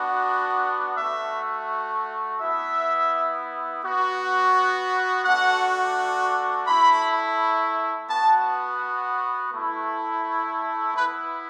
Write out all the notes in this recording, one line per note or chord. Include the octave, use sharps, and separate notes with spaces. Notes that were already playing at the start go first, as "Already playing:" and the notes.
Already playing: B3 D4 F#4
A3 F#4 E5
B3 E4 E5
B3 F#4
A3 D4 F#4 F#5
A3 E4 B5
B3 F#4 A5
A3 E4
B3 E4 B4